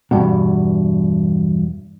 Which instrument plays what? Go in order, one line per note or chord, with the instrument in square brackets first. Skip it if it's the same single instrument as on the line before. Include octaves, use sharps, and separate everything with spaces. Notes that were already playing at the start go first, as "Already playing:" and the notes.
[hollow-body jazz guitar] E2 G2 B2